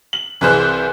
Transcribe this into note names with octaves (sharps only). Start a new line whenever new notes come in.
F#7
C2 E3 G#4 C5 F#6